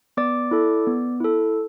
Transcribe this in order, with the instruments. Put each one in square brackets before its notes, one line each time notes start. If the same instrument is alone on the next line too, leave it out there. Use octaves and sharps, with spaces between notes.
[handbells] B3 D5 D6
E4 A4
B3
E4 A4